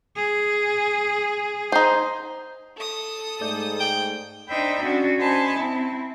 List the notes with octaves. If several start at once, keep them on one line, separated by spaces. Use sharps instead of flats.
G#4
D#4 C5
A4 D#6
G#2 A3 D5 G6
G5
D4 D#4 C5 E5 G5 B5
C#4 D4 F#4
C#4 C5 D#5 G#5 A5 B5
C4 E4